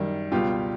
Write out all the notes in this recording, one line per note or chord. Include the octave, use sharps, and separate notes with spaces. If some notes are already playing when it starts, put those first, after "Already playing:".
Already playing: F#2 D#3 G3
C#2 B2 G3 F4 G4